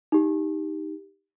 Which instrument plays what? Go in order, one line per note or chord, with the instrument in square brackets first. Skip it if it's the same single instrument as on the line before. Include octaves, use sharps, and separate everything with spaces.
[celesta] D#4 G4